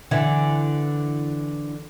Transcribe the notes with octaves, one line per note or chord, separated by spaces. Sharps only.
D3 E3 E4